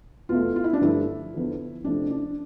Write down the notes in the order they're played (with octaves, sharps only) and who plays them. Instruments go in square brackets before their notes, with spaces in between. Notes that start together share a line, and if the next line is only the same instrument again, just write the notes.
[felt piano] E2 B2 A3 F4
F4
E4
D4
G2 D3 F3 A3 E4
E2 D3 F3
F2 C3 F3 A3 D4
D4